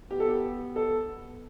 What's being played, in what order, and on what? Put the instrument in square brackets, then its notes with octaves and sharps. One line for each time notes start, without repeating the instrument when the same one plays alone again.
[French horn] B3 [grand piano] G4
[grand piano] A4
G4
A4